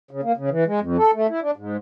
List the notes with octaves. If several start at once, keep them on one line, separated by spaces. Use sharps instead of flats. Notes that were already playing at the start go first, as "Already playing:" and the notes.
C#3
A#3
C#3
E3
G#3
F2
A4
A3
E4
D4
G#2